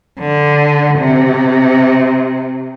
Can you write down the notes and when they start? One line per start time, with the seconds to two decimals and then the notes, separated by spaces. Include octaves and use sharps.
0.19 D3
0.98 C3